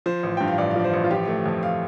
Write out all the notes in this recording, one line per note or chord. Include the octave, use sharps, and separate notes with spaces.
F3 C5
A1
G2 G5
F5
A1 D5
F5
F3 D5
C5
A1
F4
F3 G4
A3
F2
F5